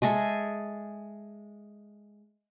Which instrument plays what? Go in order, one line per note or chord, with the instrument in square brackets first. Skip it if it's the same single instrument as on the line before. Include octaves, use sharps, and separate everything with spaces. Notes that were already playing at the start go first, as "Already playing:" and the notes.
[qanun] G#3 G#4 A4 E5